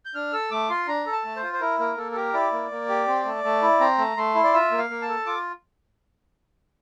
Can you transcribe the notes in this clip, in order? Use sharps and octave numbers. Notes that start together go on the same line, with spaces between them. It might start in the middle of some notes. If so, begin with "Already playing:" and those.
G6
D4 F6
A4 E6
A3 D6
F4 C6
D4 A#5
A4
A5
A3
C5
F4
C5
E4 A#4
A#3 A#4
A#3 A4
A4
G4 A#4
E4 D5
A#3
A#3
G4
C4
A3
A3
E4
C4 A#5
A3
A3 C6
E4
D5
F4 E5
A#3
F5
A#3
A5
A4
F4 D6